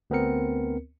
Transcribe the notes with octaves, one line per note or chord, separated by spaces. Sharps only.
D2 B3 C4 A#4 C#7